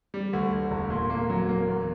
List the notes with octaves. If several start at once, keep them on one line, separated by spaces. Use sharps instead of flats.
G3
D2
D2
E1
A#2
A#3
F#3
A#3
E2